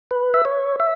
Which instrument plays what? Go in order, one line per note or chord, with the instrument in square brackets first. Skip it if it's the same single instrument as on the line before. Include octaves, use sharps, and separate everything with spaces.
[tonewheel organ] B4
E5
C#5
E5